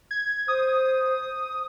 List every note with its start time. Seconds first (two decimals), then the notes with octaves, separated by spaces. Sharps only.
0.11 G#6
0.48 C5 D#6